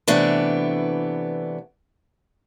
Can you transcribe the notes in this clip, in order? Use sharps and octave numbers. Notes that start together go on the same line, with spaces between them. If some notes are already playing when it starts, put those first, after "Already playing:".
C3 E3 A3 B3 D4